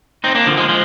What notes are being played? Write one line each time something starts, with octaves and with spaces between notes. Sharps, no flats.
C4 D#4
A#3 D4
D3 F3
F3 G#3
F3 G#3